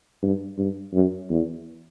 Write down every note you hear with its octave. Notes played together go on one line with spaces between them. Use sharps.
G2
G2
F#2
E2